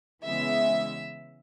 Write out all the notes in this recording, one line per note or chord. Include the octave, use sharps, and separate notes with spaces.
C#3 E3 G#3 B3 E5